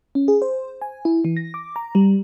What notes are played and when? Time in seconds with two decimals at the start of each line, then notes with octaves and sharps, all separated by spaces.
0.15 C#4
0.28 G#4
0.42 C5
0.82 G#5
1.05 E4
1.25 E3
1.37 A#6
1.54 D6
1.76 A#5
1.95 G3